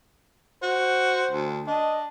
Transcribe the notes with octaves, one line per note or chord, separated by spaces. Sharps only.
F#4 C5
D2
D4 D#5